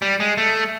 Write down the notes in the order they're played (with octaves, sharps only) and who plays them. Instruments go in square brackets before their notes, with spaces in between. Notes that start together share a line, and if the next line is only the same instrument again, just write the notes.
[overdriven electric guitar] G3
G#3
A3